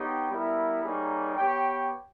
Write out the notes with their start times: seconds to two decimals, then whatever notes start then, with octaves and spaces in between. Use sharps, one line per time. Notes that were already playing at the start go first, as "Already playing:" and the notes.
Already playing: B3 D#4 G4 C#5 G5
0.30 G3 B3 E4 A#4 E5
0.83 G3 A#3 D#4 G#4 C#5
1.36 B3 G4 C#5 G5